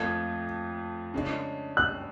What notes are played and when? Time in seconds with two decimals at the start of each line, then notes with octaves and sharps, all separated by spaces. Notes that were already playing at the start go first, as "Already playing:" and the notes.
Already playing: F2 F3 A3 F4 G#6
1.14 C#3 G#3 D4
1.77 F#6